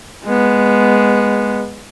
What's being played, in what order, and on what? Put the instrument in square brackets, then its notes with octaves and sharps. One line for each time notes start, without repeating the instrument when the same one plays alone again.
[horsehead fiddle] G#3 B3